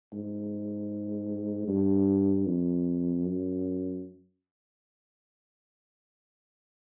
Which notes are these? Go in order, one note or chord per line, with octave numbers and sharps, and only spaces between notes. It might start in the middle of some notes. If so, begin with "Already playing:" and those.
G#2
G2
F2
F#2